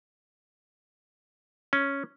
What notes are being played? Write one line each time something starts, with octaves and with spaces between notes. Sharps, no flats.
C#4